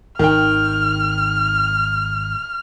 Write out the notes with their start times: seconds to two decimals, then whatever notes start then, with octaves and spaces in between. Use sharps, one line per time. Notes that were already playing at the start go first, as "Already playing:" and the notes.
0.19 G#1 D#3 G5 F6